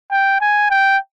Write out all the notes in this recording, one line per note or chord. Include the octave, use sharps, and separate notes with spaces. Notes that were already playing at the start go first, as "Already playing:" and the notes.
G5
G#5
G5